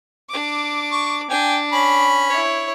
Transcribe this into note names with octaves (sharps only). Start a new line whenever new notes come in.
D4 D6
C#6
D4 G5 G#5
C#4 B5
E4 C#5